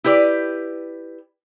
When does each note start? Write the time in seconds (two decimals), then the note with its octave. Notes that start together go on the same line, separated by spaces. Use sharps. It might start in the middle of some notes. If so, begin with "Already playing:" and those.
0.04 E4 G4 B4 D5